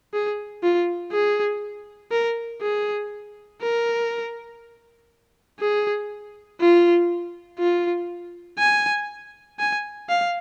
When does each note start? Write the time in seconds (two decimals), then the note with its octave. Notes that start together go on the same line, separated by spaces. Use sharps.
0.13 G#4
0.63 F4
1.12 G#4
2.12 A#4
2.62 G#4
3.62 A#4
5.60 G#4
6.61 F4
7.59 F4
8.59 G#5
9.59 G#5
10.09 F5